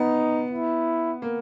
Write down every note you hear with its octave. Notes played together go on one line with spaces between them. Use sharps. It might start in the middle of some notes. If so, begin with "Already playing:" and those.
Already playing: B3 D#4
E4
A#3